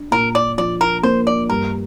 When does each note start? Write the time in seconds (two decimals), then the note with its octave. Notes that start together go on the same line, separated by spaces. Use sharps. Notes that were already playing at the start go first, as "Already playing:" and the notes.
Already playing: D4
0.11 A#2 A#4
0.35 D5
0.58 F3 D5
0.81 A#4
1.03 A#3 C5
1.27 D5
1.49 G2 A#4